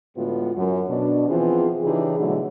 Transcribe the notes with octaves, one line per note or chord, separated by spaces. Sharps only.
A2 D3 G#3 B3 F4 F#4
F#2
B2 D4
E3 F3 B3 C4 F4 G#4
C#3 E3 D4 D#4 G4 G#4
B2 D3 E3 F#3 G3 A3